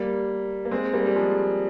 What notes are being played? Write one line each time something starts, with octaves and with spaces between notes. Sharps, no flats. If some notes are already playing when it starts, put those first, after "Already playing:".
Already playing: G3 A#3
A#3
G#3 C4
G3 A#3
G3
F3 G#3